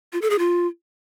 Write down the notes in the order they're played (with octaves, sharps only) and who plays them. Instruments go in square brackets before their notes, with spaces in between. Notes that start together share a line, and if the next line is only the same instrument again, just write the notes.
[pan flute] F4
A4
G#4
F4